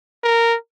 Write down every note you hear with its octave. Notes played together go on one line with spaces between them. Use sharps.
A#4